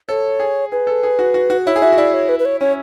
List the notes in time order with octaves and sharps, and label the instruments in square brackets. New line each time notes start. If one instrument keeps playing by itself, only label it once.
[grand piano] A4 [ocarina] C#5
[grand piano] G#4
[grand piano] G#4 [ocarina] B4
[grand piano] A4
G#4
F#4
F#4
F#4
[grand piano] E4 [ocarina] C#5
[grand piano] G#4
[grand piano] F#4 [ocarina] E5
[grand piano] F#4
[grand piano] E4 [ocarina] D5
[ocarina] C#5
B4
B4
C#5
[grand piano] C#4 [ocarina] C#5